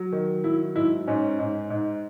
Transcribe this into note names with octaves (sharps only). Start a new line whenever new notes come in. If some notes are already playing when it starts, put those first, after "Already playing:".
Already playing: F#3
D#3
F#3 E4
G#2 E4
G#2 C#4
G#2
G#2